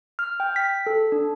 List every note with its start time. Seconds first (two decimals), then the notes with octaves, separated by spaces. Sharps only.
0.19 F6
0.40 G5
0.56 B6
0.86 A4
1.12 D4